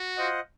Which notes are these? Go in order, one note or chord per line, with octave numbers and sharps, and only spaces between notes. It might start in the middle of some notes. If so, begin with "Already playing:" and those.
Already playing: F#4
F4 C5 D#5 F#5